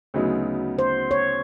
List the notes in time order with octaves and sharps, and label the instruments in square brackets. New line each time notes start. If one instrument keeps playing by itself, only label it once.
[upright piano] D2 C#3 F#3 B3 D#4
[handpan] C5
C#5